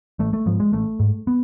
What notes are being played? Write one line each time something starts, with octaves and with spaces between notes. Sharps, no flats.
A1 A3
A3
G#2 F3
G#3
A1 A3
G#2
B3